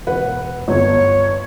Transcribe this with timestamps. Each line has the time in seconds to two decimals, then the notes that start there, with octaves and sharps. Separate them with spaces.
0.07 E1 B4 F#5
0.68 G1 C#5